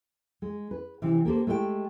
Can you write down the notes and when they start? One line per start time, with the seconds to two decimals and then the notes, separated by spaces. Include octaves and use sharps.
0.42 G#3
0.71 B4
1.02 C3 E3
1.25 A#3 G4 A4 C5
1.47 G#3 A3 G4 D5 G5